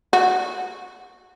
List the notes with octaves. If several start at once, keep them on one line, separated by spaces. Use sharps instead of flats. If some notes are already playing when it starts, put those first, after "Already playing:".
F#4